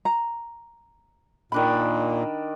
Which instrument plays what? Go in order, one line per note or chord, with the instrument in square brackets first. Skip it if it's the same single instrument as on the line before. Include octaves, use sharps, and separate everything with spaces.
[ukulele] A#5
[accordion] A#2 [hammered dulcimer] D#3 D4 B5